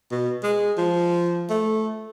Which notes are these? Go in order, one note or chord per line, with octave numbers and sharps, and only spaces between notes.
B2
G#3
F3
A3